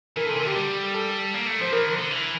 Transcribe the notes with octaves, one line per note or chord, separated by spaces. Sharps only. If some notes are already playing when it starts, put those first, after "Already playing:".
E3 A#4
C3 A4
A#4
D3 G4
G3
A4
A#3
A3
F3 C5
E3 A#4
D3
D3
E3